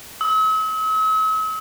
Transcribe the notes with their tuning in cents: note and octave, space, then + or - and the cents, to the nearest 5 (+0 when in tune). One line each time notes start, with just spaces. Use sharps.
E6 -45